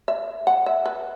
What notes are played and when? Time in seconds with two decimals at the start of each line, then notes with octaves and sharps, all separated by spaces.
0.08 E5
0.47 F#5
0.66 E5
0.86 B4